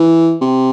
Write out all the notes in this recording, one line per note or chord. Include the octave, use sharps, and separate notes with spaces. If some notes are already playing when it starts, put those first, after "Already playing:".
Already playing: E3
C3